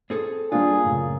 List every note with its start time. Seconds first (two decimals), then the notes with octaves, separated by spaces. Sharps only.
0.10 C4 G#4 A4
0.52 A#2 G3 C4 D4 F4 G#4
0.84 F#2 A2 C#3